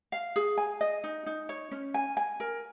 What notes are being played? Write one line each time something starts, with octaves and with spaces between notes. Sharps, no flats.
F5
G#4
G#5
D#5
D#4
D#4
C#5
C#4
G#5
G#5
A#4